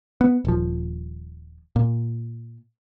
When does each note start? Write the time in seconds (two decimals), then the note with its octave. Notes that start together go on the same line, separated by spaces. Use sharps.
0.21 B3
0.45 D#1 F3
1.76 A#2